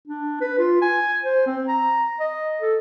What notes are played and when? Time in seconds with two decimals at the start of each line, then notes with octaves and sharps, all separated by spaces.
0.08 D4
0.41 B4
0.58 F4
0.82 G#5
1.23 C5
1.46 C4
1.68 A#5
2.20 D#5
2.61 A4